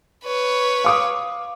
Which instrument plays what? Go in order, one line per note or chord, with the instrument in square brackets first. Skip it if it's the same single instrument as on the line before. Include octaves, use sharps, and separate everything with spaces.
[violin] B4 C#5
[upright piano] F5 D6 D#6